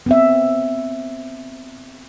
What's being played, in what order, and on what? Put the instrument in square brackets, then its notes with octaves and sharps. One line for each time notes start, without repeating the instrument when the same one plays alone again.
[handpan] B3 C4 E5